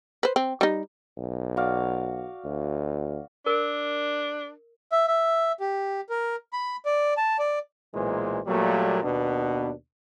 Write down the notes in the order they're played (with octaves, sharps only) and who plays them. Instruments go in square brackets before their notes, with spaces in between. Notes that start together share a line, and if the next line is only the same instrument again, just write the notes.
[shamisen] B4 C5
C4
G3 D#4
[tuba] B1
[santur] F#4 D5 F5
[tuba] D2
[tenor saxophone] D4 [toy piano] A#4
[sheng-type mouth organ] E5
E5
G4
A#4
B5
D5
A5
D5
[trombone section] B1 A#2 E3 G#3 C5
A#2 F#3 G3 A3 A#3
D#2 B2 B3 D4